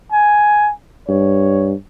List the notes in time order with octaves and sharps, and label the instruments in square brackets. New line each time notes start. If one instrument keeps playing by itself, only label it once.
[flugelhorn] G#5
[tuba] G2 [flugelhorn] C#5